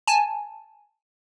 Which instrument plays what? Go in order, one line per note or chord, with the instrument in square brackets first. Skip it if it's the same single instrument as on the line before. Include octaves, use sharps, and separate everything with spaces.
[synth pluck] G#5 A5